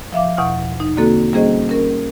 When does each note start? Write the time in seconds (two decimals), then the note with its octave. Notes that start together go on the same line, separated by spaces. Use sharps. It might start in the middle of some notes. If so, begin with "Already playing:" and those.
0.13 F3 E5 F5 D6
0.37 E2 B2 F#5 C#6 F6
0.80 D#4
0.97 D3 A#3 C4 F#4 A4
1.33 G3 A#3 C#4 G#4 C5 D#5
1.69 C#4 A#4